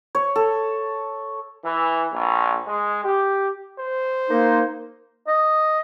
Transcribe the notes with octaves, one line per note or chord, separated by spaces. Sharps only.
C#5
A4
E3
A#1
G#3
G4
C5
A#3 D#4
D#5